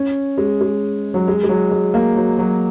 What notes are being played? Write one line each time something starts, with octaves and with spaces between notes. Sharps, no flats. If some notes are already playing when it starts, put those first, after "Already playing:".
Already playing: C#4
G#3
G#3
F#3
G#3
G#3
F#3
G#3
A#3
F#3
F#3